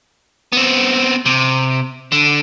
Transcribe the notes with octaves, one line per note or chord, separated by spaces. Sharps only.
B3 C4
C3
D3